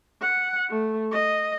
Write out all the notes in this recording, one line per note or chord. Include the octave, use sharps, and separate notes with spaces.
F#5
A3
D#5